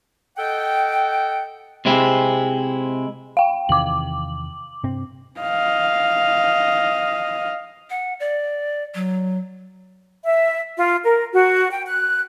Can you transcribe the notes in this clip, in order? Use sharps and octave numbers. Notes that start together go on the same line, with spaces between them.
A4 D#5 F#5 G5
C3 G#3 C4 E4
F5 G5
E2 C3 D#3 D6 F#7
G2 C3 C4
D#5 F5
F#5
D5
F#3
E5
F4
A#4
F#4
G5
F#6